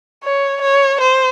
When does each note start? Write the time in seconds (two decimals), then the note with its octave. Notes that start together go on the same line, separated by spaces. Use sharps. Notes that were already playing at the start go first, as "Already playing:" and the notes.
0.24 C#5
0.62 C#5
1.00 C5